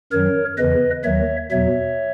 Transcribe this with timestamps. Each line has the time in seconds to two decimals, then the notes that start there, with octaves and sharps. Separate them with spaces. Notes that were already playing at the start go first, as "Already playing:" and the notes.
0.12 F#2 D#3 F#3 A#4 C#5
0.58 E2 C#3 E3 B4 D#5
1.04 D#2 D#3 F#3 C#5 E5
1.51 E2 B2 F#3 C#5 E5